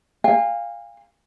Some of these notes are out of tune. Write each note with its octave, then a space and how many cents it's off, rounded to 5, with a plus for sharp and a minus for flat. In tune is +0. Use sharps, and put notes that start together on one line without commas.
F5 +0 G#5 -40